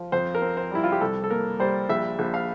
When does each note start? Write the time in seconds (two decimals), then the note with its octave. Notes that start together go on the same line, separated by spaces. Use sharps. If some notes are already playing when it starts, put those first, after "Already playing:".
Already playing: F3
0.12 F2 C5
0.35 A#4
0.42 C4
0.57 C5
0.71 G3 E4
0.84 F4
0.92 G4
1.01 C2 A4
1.24 A4
1.30 A#3 A#4
1.60 G3 C5
1.89 A#1 E5
2.19 A#1
2.34 F5